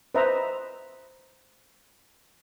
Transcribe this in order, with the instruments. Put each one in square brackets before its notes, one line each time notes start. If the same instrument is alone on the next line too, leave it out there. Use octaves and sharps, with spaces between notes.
[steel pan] B4 C5 D#5 E5 A#5